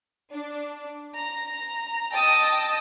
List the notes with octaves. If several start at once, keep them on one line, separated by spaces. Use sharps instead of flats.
D4
A#5
D#5 G5 A5 D#6 E6 A6